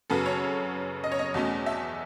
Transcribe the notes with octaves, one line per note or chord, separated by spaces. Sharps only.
F#2 C#3 F#3 B3 A4
C#5
D#5
C#5
D#5
E2 B2 A3 C#4
E5